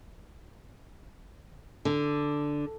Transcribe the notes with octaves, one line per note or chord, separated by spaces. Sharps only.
D3